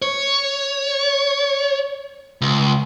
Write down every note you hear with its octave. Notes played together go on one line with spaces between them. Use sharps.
C#5
C#2